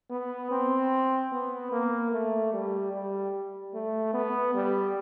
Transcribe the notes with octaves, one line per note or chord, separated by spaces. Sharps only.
B3
C4
B3
A#3
A3
G3
G3
A3
B3
G3